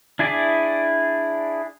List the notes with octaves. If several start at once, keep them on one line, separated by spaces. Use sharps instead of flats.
D4 E4 G#4 D5